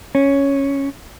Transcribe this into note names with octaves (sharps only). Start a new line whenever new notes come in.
C#4